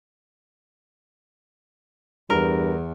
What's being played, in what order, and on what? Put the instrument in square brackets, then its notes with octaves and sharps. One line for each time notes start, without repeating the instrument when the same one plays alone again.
[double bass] E2 [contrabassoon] G2 [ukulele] A#4